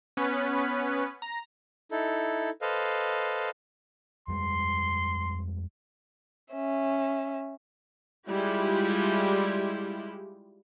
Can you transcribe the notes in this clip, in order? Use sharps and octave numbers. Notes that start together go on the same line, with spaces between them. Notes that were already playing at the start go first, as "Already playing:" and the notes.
B3 C#4 B4
A#5
D#4 E4 A4
A4 B4 C5 D#5 F5
F2 G3 G#3 C6
C#4 E5
G3 G#3 E4 F4 G4